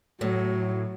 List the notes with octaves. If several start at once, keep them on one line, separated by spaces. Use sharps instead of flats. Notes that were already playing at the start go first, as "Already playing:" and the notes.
A2 F#3